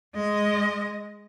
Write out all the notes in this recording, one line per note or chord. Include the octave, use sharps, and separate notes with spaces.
G#3 D#5